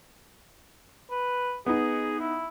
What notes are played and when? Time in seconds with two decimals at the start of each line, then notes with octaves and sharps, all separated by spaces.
1.11 B4
1.66 B3 D#4 G#4
2.20 E4